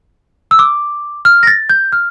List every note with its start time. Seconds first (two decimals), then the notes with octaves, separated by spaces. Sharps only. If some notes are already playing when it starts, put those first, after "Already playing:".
0.51 E6
0.59 D6
1.25 F6
1.43 A#6
1.47 A6
1.70 G6
1.92 F6